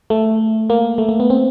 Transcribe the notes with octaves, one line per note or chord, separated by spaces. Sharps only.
A3
A#3
A3
A#3
B3
C4